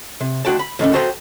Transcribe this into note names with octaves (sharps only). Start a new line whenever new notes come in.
C3
D2 E3 F#4 G5 A5
B5
A2 D#3 C4 C#4
F#4 A4 C5 D#5 G5